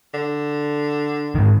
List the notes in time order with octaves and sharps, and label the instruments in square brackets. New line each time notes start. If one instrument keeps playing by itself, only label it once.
[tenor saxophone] D3
[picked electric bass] G#2 D#3